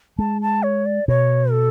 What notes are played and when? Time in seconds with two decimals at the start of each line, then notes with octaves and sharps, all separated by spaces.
0.18 G#3 A5
0.42 A5
0.63 C#5
0.86 D5
1.08 B2 C#5
1.52 A4